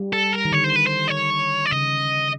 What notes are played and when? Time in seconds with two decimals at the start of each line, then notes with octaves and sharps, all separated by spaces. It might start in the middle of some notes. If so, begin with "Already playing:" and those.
Already playing: G3
0.13 A4
0.33 A#4
0.45 D#3
0.52 D3 C#5
0.64 C5
0.76 B4
0.87 C5
1.08 D5
1.11 C#5
1.65 D5
1.71 C#3 D#5